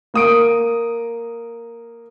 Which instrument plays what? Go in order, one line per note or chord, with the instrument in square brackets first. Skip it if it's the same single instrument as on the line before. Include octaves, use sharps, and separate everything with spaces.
[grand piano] A#3 D#6 D7